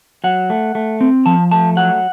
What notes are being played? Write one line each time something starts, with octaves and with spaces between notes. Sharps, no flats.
F#3 F#5
A3
A3
C4
F3 A5
A3 A5
F#3 F#5